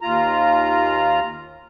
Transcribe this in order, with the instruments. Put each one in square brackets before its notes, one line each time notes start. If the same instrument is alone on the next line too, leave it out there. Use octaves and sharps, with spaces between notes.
[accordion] D#2 F4 A#5